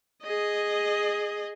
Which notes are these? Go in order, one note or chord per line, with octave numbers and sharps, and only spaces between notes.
G#4 D#5